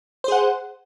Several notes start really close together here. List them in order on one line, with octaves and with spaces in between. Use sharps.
C5 G#4 F#5